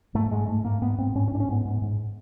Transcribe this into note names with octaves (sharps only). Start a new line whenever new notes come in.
G#2 A3
G#2 G#3
G#2 A3
G#2 A#3
G#2 B3
G#2 C4
G#2 C#4
C#4
G#2 D4
C#4
G#2 B3
G#2
G#2